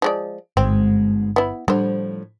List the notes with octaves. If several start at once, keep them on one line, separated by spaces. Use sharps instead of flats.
F3 G#3 D5
G1 G#2 B2 G#3 C4
B3 E4
A2 D3 F3 G3 C5